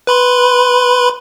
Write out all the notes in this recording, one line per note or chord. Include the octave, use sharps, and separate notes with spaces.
B4 B5 C6